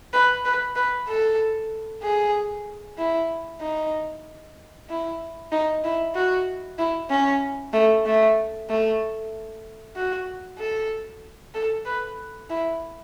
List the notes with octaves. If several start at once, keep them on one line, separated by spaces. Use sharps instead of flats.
B4
B4
B4
A4
G#4
E4
D#4
E4
D#4
E4
F#4
E4
C#4
A3
A3
A3
F#4
A4
A4
B4
E4